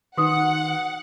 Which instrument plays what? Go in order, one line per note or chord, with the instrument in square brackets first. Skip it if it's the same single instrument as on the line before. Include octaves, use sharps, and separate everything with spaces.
[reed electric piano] D#3 D#4 [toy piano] F#4 B4 D#6 [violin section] F#5